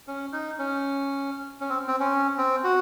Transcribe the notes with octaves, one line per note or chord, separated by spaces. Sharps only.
C#4
D#4
C#4
C#4
C4
C4
C#4
C4
F#4